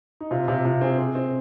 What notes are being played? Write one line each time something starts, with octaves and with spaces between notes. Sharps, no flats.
D#4
C3 F4
C3 F4
C3 F4
C4 G#4
C4
C4